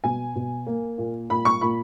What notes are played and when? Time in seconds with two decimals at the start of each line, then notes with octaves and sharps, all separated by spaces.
0.04 B2 G#5
0.36 B2
0.67 A#3
0.98 A#2
1.30 A#2 B5
1.45 C#6
1.61 A#2 B5